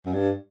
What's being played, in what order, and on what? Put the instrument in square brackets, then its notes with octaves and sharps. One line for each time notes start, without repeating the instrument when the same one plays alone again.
[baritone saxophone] F#2
G2